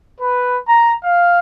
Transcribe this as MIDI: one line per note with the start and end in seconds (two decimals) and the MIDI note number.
0.20 0.56 71
0.67 0.90 82
1.04 1.39 77